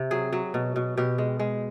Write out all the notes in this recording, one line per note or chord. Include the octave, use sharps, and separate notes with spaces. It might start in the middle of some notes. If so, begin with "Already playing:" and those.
Already playing: C3
F#3 G#4
F#3
B2
B2
B2 G4
G#3
G#3